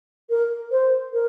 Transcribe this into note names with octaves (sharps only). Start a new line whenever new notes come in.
A#4
C5
A#4